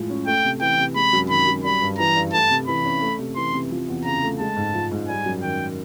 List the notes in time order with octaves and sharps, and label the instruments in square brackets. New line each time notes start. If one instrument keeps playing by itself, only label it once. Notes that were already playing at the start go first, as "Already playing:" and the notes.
Already playing: [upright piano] A2 F3 G#3
C#4
[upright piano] A3 [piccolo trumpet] G5
[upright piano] C3
[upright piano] E3 [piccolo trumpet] G5
[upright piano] C3
[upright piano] G#3 [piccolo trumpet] B5
[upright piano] F#2
[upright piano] D#3 [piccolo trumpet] B5
[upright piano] F#2
[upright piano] G3 [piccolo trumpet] B5
[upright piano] G2
[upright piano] E3 [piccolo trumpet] A#5
[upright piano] G2
[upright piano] A3 [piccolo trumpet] A5
[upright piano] C3
[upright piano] E3 [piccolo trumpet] B5
[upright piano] C#4
A3
C3
[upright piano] E3 [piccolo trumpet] C6
[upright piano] C3
F3
E2
[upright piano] C#3 [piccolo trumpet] A#5
[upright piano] A3
[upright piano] G#3 [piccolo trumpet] A5
[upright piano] G#2
F3
G#2
[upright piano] G3 [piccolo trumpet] G#5
[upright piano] F#2
[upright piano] D#3 [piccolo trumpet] G5